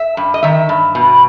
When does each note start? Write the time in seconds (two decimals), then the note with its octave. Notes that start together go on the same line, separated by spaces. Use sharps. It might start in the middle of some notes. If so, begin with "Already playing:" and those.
Already playing: E5
0.17 G2
0.34 D#5
0.43 D#3 E5
0.69 G2
0.95 B2